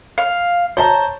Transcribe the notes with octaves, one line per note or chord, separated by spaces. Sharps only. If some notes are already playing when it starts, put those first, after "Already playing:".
F5
C5 C#5 A5 A#5